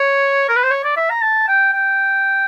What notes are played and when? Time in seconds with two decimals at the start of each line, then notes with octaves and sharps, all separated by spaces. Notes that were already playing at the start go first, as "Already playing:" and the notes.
Already playing: C#5
0.49 A#4
0.56 B4
0.63 C5
0.71 C#5
0.84 D5
0.96 E5
1.09 A#5
1.22 A5
1.48 G5
1.73 G5